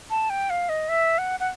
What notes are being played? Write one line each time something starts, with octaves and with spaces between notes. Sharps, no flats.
A5
G5
F5
D#5
E5
F#5
F#5